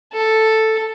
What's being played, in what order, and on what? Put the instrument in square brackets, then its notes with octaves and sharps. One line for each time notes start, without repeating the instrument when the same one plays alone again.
[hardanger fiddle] A4